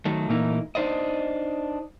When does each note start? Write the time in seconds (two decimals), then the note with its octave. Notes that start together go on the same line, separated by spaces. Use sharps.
0.05 D#3 F#3 A3
0.29 A#2 E3 A3 A#3 D#4
0.75 D4 D#4 C5 D5 D#5